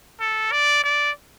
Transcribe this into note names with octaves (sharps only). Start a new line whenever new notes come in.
A4
D5
D5